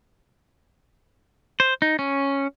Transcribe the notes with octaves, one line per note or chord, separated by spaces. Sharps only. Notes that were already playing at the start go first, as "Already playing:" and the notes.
C5
D#4
C#4